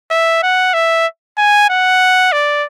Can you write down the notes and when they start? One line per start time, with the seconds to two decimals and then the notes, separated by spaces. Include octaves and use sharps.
0.11 E5
0.43 F#5
0.74 E5
1.38 G#5
1.69 F#5
2.32 D5